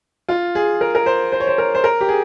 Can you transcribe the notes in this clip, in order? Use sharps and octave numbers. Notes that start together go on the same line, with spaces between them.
F4
G#4
A#4
A#4
C5
C5
C#5
C5
A#4
C5
A#4
G4
G#4